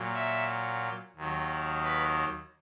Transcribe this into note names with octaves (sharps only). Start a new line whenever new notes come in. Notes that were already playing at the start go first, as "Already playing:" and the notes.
Already playing: A#2 F#3
E5
D#2 D#3 F#3
B4